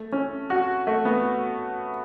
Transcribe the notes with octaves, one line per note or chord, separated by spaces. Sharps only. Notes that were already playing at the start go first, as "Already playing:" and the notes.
Already playing: A3
C#4
F#4
A3
B3